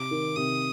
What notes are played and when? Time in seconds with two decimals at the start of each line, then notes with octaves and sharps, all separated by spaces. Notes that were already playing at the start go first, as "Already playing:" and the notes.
Already playing: C3 D6
0.11 D#3
0.36 C3 D#6